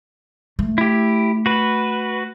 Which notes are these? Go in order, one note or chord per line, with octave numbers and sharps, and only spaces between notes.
A3
E4 G4
F#4 B4